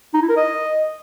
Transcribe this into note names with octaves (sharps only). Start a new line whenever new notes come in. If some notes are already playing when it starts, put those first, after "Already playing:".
D#4
E4
A#4
D#5